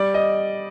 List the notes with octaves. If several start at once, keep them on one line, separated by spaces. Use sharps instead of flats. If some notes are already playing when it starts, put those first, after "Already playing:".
Already playing: G3 D5
D#5